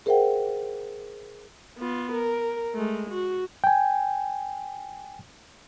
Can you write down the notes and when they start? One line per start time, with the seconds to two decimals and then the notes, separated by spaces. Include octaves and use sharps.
0.06 G#4 A#4 C5 E5 F#5 G5
1.78 B3 F4
2.12 A#4
2.74 G#3 A3
3.10 F#4
3.64 G5 G#5